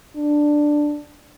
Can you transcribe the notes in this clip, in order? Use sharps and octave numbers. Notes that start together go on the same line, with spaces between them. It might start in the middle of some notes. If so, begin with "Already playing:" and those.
D4